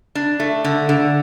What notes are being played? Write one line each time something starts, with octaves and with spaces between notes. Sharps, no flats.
D4
A3
D3
D3